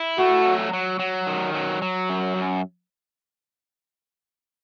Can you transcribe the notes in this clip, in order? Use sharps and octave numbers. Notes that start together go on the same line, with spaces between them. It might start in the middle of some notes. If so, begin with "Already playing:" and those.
Already playing: E4
A3 F#4
F#3
F#3
F#3
D#3
F#3
F#3
F#2
F#2